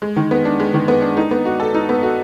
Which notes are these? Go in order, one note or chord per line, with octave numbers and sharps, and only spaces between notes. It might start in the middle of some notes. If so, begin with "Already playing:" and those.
G#3
D#3
B3
D4
G#3
D#3
B3
D4
D#4
B3
F#4
A4
D#4
B3
F#4